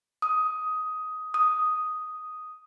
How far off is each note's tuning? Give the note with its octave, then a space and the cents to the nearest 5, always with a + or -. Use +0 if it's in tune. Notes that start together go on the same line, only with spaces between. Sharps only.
D#6 +10
D#6 +0